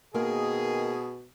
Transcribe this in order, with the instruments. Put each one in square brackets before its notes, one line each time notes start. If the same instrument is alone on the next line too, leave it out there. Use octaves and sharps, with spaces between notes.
[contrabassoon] B2 [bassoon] D#3 [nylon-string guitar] A#3 [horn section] G#4